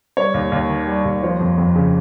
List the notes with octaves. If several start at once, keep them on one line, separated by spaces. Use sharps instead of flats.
G3 C#5
D#2
D#2
D#3
G3
D#2
F3 C#5
F2
F2
C#3